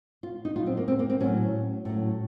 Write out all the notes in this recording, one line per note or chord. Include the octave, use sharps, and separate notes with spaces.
F4
D#4
A#2 F#3 F4
C4
A#3
C4
A#3
C4
A2 F#3 C#4
A2 F#3